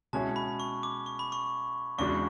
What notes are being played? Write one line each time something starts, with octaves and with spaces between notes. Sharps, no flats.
B2 G#3 C#4 E4 G#4 A5
B5
C#6
D6
C#6
B5
C#6
E2 C#3 G#3 D4 F#4 C#6